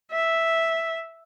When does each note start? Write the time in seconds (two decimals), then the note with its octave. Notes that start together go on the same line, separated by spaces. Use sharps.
0.11 E5